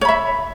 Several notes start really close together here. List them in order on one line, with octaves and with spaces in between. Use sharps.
C#5 B5 E5